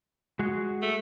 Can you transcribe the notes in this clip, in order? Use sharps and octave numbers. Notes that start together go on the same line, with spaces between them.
G#3 F#4 G#4
A3